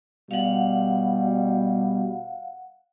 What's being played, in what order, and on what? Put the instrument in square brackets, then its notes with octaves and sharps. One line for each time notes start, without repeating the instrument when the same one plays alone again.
[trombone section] B2 G3 [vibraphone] F5 F#5